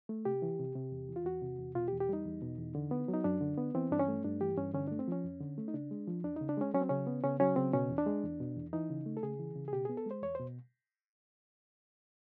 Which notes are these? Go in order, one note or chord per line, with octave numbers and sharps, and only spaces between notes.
A3
C3 G4
E3
C3
C3
E2
E3
F4
E2 F#4
C3
E2
B2 F4
G4
E2
G4
G3 D#4
E2
B2
E2
D3
B3
F#3
D#4
F#2 D4
D3
B3
E3 C4
G2 D4
C#4
A3
G2 D4
E3 G4
G2 C#4
D3 C#4
A3 D4
C4
F3 C#4
F2
D3
A3
D#4
C#3 D4
G#3
F3
E2 D4
C#3 D#4
D4
G#3 C#4
F#3 C#4
C4
C#3 C#4
B3
C#3 C#4
F#3 C#4
C#3 C4
B2 C#4
E2
D4
G#3
E2
B2
E2
E3 D#4
C#3
A3
A4
C#3 G#4
E3
C#3
G#4
B2 G4
B3 G#4
A4
G#3 C5
E2 C#5
B2 C5